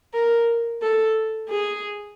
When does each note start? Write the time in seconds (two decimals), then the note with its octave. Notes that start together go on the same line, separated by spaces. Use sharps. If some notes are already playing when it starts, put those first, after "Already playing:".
0.14 A#4
0.82 A4
1.49 G#4